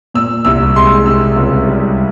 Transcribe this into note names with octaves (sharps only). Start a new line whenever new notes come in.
A#2 E6
C2 E6
G#3 C6
C3 E6
C#2
G3